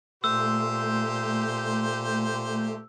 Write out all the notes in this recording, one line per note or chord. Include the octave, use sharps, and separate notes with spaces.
A#2 A3 G4 C5 E6